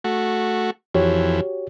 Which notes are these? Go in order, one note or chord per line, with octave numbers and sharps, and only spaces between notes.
A3 F#4
F2 E3 F#4 G4 C#5